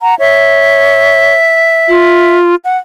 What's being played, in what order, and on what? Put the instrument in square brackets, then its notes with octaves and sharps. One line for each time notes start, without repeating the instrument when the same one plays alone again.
[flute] F#5 [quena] A#5
[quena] C#5 [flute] E5
[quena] F4
F#5